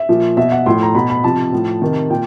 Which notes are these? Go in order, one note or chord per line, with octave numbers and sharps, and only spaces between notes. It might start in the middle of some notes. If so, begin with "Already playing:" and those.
Already playing: E5
A#2 F3
B2 E5
F#5
A2 F3 C6
A#5
B2 B5
B5
C3 F3 A5
A2 F3
C3 D#3
A#2 G5